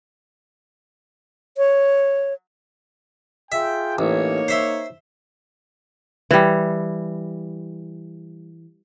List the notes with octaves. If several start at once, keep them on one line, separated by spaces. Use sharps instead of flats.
C#5
F4 G#4 E5 G5
A1 A#3 D#4 C#5
C5 E5 C6
E3 G3